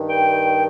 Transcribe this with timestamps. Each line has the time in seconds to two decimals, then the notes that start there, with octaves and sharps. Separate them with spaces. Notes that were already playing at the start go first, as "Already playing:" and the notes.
Already playing: G2 D#3
0.09 G5